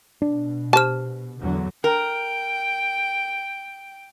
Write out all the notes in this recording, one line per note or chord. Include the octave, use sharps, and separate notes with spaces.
B2 D4
G4 C5 A5 F6
E2 D3 F#3
A#4 G5